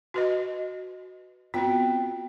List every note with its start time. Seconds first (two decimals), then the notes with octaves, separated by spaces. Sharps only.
0.14 F#4 B4 D#5
1.54 B3 C4 F4 F#4 G5